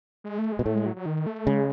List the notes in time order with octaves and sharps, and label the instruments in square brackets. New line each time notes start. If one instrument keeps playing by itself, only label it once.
[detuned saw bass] G#3
A3
G#3
[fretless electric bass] B2
[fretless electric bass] A2 [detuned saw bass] A3
[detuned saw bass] G#3
F#3
F#3
D#3
A3
[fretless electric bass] C#3 [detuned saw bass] G#3